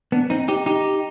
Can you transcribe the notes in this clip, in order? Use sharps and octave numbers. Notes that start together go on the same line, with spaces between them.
B3 D4
C4 D#4
D#4 G4
D#4 G4